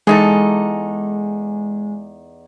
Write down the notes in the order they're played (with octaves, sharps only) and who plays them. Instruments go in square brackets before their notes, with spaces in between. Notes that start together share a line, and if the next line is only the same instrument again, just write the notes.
[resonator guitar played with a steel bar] E2 D#4 A4 [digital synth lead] G#3